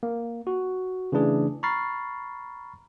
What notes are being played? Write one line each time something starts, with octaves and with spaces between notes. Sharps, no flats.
A#3
F#4
C#3 E3 A3 D4 G#4
A#5 B5 C#6 F6 A6 C7